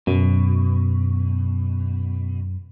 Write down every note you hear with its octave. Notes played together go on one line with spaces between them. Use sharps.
F#2 B2